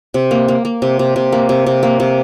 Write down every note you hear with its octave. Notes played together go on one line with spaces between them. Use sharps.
C3
A#3
A#3
A#3
C3
C3
C3
A#3
C3
C3
A#3
C3